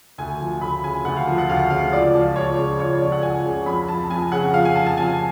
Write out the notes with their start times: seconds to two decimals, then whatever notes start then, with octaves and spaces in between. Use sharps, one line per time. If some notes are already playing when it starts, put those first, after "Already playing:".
0.18 D2 G#5
0.40 F3
0.61 D2 B5
0.83 C#3 G#5
1.05 D2 F#5
1.17 F5
1.27 F3
1.38 F#5
1.49 D2 F5
1.70 C#3 F5
1.92 C#2 D5
2.15 F3
2.36 C#2 C#5
2.58 C#3
2.79 C#2 C#5
2.91 C#5
3.01 F3 D5
3.12 F#5
3.23 C#2 G#5
3.45 C#3
3.66 F2 B5
3.89 F3 A5
4.10 F2 G#5
4.31 C#3 F#5
4.53 F2 F5
4.65 G#5
4.76 F3 A5
4.86 A5
4.97 F2 G#5